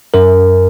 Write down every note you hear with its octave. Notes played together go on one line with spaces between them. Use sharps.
F#2 A#4